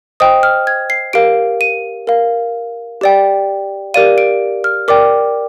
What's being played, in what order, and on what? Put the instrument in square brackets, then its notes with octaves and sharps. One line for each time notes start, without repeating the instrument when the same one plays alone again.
[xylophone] C5 D#5 G5 D#6
F6
G#6
C7
G4 A#4 F5 D7
D#7
A#4 F5
G4 D5 G5
G4 A#4 D5 F5 D#7
D7
F6
A#4 D5 G5 D6